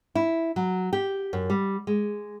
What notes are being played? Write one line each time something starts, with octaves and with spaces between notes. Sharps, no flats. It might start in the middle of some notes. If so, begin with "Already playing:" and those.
E4
F#3
G4
F#2
G3
G#3